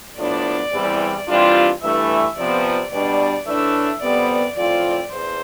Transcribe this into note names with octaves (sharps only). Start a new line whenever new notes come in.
A2 F3 B3 D4 D5
E2 C3 E3 G3
C3 E3 G3 D4 F4
G2 E3 A3 E5
C3 F3 B3 D5
B2 G3 D4 D5
A2 E3 A3 D4 E5
F2 C3 G3 B3 D5
A2 F3 C4 F4 D5
E2 C5